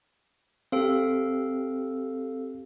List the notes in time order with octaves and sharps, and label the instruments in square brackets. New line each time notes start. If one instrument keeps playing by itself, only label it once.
[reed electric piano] C4 G4 [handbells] A4 F5